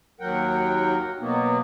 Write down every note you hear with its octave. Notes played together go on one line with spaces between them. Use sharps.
D#2 F#3 A#4 F#5 G5
B2 F#3 A#3 B3